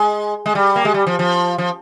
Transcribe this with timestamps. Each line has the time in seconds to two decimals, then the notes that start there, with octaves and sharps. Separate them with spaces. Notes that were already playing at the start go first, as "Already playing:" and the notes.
Already playing: G#3
0.46 G#3
0.55 G3
0.76 A#3
0.85 G#3
0.94 G3
1.07 F3
1.19 F3
1.58 F3